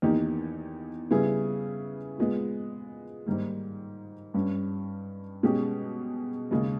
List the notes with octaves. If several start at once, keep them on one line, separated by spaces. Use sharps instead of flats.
E2 D#3 A#3 D#4 G4
C#3 G3 B3 E4 G#4
A#2 G#3 B3
G#2 D#3 G3 A#3
G2 G3 C#4
B2 G#3 C#4 G4
D#2 C#3 G#3